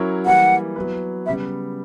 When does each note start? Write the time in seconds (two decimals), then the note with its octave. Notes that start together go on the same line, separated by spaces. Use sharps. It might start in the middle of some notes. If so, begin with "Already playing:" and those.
Already playing: F#3 C#4 E4 A#4 C#5
0.26 E3 G3 A#3 F#5
0.76 F#3 B3 E4 B4
1.26 C#3 G3 B3 E5